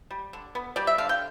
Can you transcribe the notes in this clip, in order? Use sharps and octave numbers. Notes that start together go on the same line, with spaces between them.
G3
D3
B3
G3 D5
E5
D3 F5
G5